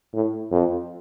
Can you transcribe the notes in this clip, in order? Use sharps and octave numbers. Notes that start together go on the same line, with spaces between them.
A2
F2